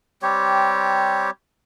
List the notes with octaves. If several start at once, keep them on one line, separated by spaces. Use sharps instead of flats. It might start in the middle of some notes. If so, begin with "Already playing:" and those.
G3 C4 G4 C#5